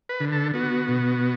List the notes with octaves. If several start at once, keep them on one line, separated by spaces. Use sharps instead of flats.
B4
D3
A4
B3 F#4
B2